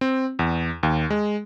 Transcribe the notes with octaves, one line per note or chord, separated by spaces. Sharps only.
C4
E2
D#2
G#3